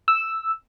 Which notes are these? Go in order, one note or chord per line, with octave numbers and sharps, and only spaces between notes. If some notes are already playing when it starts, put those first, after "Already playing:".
E6